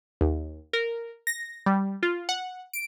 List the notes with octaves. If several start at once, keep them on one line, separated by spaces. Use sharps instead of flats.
D#2
A#4
A#6
G3
F4
F#5
D7